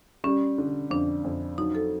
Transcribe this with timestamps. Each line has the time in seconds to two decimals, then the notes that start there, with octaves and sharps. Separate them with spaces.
0.24 G3 C#4
0.58 D3
0.91 F2 D4
1.25 F2
1.58 F#3 D#4
1.75 A4